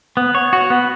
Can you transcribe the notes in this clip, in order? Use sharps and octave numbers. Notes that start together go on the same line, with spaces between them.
B3
C#5
F#4
B3